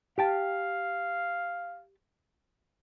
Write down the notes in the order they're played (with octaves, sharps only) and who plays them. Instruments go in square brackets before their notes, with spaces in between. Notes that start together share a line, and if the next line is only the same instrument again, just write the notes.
[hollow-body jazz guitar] G4 G5 A5 [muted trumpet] F5